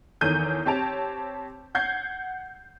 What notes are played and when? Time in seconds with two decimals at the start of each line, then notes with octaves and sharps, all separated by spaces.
0.21 E2 D#3 A4 C#5 G6 D#7
0.66 C4 G4 C#5 A5 D7 F7
1.75 F#5 G6 G#6 C7